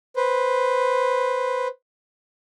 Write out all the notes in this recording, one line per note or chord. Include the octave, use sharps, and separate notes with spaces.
B4 C5